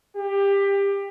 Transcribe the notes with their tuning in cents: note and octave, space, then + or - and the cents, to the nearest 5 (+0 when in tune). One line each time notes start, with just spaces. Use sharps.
G4 +20